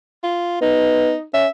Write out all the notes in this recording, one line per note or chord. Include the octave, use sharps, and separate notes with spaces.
F4
B3 D#4
C#4 E5